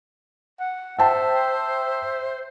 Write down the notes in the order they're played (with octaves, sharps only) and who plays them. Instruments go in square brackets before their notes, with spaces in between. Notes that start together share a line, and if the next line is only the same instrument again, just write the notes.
[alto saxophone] F#5
[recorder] C5 [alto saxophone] E5 [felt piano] G5 A5